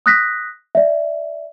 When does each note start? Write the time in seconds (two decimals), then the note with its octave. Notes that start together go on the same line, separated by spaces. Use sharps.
0.06 D#6 F#6 A#6 B6
0.75 D5 E5